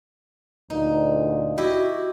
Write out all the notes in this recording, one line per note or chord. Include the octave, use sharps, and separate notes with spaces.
D2 A#2 D#4
E4 F#4 G4 D#5